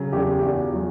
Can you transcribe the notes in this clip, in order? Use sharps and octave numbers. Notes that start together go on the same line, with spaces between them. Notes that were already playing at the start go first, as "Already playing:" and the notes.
Already playing: C#3 F#3
E2 G4
E2
F#4
F#3